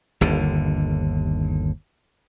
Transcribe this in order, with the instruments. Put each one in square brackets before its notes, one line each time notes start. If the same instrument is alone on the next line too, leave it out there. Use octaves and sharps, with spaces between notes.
[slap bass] G1 D#2 D3